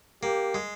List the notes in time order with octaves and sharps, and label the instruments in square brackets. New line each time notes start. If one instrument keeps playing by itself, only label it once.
[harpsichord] A#3 [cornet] G4
[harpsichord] G#3